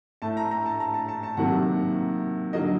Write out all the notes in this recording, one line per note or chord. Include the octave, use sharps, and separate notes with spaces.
A2 A3 A5
A#5
A#5
A5
A#5
A5
A5
A5
C3 D#3 F#3 A#3 F#5
D3 F#3 A#3 D#5